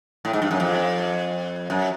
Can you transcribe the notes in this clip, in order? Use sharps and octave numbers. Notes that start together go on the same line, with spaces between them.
A2
G#2
G2
F#2
F2
F#2